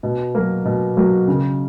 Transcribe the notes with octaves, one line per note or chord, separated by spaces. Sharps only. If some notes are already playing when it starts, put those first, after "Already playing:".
B2
F#3 A#3
B2
F#3 A#3
C#3